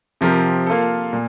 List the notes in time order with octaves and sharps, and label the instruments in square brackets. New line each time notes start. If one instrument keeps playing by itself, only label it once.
[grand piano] C3 F3 C4 G4 A#4
A#3 F4 A4
A#2